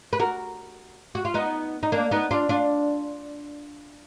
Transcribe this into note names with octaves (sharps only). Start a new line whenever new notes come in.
B4
F#4 A#4
F#4
F4
B3 D#4
D#4
A#3 D4
B3 D#4
D4 F4
D4 F4